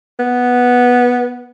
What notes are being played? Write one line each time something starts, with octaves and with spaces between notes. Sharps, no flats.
B3